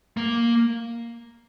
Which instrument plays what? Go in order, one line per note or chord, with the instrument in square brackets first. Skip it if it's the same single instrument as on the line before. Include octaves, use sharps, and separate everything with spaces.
[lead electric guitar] A#3